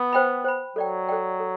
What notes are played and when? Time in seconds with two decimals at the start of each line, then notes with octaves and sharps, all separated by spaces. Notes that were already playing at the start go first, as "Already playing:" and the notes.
Already playing: B3
0.13 C5 G5 B5
0.44 C5 G5 B5
0.76 F#3 A4 D5 G5
1.08 A4 D5 G5
1.40 A4